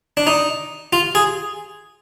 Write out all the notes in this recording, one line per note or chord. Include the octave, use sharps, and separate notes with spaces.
D4
D#4
F4
G#4